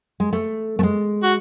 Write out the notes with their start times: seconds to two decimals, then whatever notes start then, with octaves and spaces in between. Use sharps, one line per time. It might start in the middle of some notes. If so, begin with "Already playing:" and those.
0.20 G#3
0.33 A3
0.79 A3
0.83 G#3
1.23 F#4